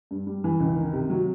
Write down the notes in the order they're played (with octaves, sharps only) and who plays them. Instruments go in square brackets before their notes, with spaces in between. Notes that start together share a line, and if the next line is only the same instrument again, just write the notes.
[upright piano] G2
G3
E3
C#2
D#3
C3
F#3